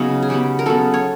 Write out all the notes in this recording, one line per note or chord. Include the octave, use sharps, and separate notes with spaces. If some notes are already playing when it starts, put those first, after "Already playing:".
Already playing: C#3 F#3 B3 D#4
G#4
C#3 F#3 B3 G4
A#4
C#3 F#3 B3 A4
C#5